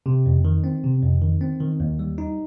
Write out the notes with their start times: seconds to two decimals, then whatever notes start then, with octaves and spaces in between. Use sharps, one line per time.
0.06 C3
0.26 F2
0.45 D#3
0.64 C4
0.84 C3
1.03 F2
1.22 D#3
1.41 C4
1.60 D#3
1.80 D#2
1.99 G3
2.18 D#4